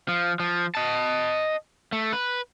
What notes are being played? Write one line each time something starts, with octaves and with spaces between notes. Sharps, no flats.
F3
F3
D#5 A5
A3
B4